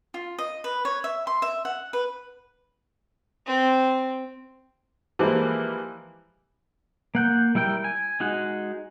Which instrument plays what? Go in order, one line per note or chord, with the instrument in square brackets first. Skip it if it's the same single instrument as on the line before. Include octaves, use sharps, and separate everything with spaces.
[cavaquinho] F4
D#5
B4
C#5
E5
C6
E5
F#5
B4
[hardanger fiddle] C4
[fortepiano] E3 F3 G3 G#3 A#3
[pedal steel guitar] A#3 F#5 G6
G3 E4 A#4 G5
G#5
G#3 D#4 F#4